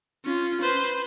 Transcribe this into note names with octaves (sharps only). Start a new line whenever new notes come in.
C#4 F4
B4 C5